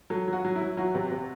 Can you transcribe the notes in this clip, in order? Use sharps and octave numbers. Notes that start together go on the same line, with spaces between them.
F#3 A4
F#3 F#4
F#3
E4
F#3
F#3 F#4
C3
C3